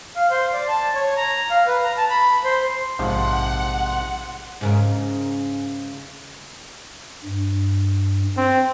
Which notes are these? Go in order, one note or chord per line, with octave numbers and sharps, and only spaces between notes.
F5
C5
D5
A5
C#5
A#5
F5
B4
A#5
A5
B5
C5
A#1 G#2 C3 F3 F#5 C6
G#2 C#3 A#4
G2
C4